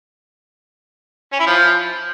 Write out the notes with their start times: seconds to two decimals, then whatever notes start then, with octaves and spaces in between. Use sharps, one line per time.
1.33 C#4
1.40 E4
1.47 F3